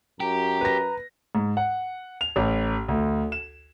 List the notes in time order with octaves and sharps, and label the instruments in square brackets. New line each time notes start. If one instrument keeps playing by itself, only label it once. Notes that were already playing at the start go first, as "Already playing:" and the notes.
[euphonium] F#2 [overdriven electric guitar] G4 [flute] A#5
[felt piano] B4 A#6
[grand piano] G#2
F#5
F7
A1
D2
E7